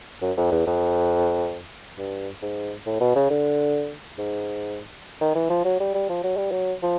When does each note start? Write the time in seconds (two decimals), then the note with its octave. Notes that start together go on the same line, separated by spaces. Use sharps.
0.22 F#2
0.37 F2
0.52 E2
0.67 F2
1.98 G2
2.42 G#2
2.86 A2
3.01 B2
3.15 C#3
3.30 D3
4.18 G#2
5.21 D#3
5.35 E3
5.50 F3
5.65 F#3
5.80 G3
5.94 G3
6.09 F3
6.23 F#3
6.37 G3
6.51 F#3
6.82 F3